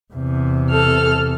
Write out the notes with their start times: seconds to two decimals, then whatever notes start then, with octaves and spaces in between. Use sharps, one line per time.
0.13 E2 C3
0.70 A4 F6